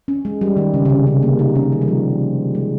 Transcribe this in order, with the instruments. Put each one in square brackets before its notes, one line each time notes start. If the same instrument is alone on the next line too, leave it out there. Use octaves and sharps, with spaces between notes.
[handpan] C#4
G#3
G3
D#3
C#3
C#3
C3
C#3
A#3
D#4
C#4
D#3
G3
F3
G#3